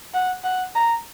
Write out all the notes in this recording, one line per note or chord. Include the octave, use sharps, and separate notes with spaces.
F#5
F#5
A#5